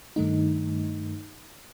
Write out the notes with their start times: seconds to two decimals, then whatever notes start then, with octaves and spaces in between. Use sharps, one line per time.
0.16 G2 D#3 A3 D#4